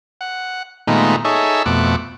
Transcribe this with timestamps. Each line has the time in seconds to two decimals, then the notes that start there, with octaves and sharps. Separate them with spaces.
0.21 F#5
0.87 A#2 D#3 G#3 A3 B3 D#4
1.25 D#4 G#4 A4 C#5 E5
1.66 F2 B2 A3 F#5 D6